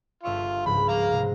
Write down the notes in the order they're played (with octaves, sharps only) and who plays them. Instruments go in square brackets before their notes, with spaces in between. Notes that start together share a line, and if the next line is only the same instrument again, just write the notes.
[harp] G1 E5 C#6 [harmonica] F4
[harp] C#2 G#2 F3 [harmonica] B5
[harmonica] F5 A#5
[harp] G#2 C3 G#3